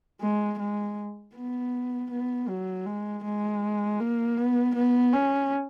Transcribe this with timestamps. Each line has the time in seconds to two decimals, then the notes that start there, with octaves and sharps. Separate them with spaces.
0.21 G#3
0.59 G#3
1.35 B3
2.11 B3
2.49 F#3
2.86 G#3
3.24 G#3
4.00 A#3
4.38 B3
4.75 B3
5.13 C#4